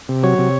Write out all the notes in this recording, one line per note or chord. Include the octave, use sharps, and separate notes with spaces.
C3
F#3 C#5
C3